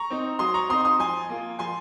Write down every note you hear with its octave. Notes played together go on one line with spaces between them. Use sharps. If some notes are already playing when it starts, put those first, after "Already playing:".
Already playing: A#5 C#6
C4 D#4
F#3 C6 D#6
A#5 C#6
C4 D#4 C6 D#6
C6 D#6
F3 G#5 C6
A#3 F4
F3 G#5 C6